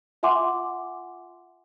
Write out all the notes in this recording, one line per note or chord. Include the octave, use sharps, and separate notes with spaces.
F4 E5 F#5 G#5 C6 D6